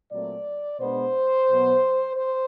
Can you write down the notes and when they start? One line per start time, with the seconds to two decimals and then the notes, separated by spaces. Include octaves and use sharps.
0.11 A#2 F#3 A3 C4 D5
0.80 B2 G#3 B3 D4 C5
1.49 B2 F#3 B3
2.17 C5